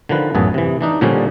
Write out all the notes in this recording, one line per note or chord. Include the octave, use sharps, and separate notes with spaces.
D3 D#3 F3 B4
A1 F#2 B3 G#4 A5
C3 E3
E3 D4 D#4
A#2 D3 F3 G3 C#4